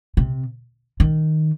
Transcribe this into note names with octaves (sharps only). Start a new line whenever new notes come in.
C3
D#3